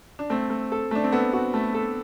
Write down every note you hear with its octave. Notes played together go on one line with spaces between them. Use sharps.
D4
A3 C4
A3
A4
A3 D4
C4
B3 A4
F#4
A3
A4